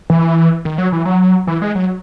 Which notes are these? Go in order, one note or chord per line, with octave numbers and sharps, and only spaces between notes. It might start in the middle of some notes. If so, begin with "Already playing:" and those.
E3
D#3
F#3
E3
F#3
E3
G#3
F#3